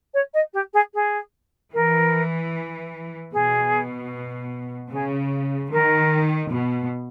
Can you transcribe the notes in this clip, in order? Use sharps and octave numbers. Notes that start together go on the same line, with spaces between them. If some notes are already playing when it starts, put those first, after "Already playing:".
C#5
D#5
G4
G#4
G#4
E3 A#4
B2 G#4
C#3 G#4
D#3 A#4
B2